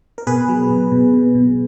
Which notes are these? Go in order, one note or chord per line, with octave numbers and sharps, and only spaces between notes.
A#4
B2 G#4 B4
F#3
B2
B2
B2
B2